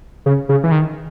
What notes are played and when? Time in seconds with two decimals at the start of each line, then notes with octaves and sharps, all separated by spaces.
0.26 C#3
0.49 C#3
0.64 E3
0.72 D#3